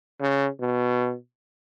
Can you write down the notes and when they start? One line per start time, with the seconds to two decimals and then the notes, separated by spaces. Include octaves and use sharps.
0.21 C#3
0.60 B2